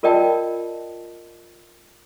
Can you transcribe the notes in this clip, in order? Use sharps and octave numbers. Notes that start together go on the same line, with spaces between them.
F4 A#4 D5 D#5 G5 A5